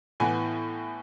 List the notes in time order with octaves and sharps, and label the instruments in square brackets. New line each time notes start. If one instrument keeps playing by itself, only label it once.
[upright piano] A2 E3 B3 G#5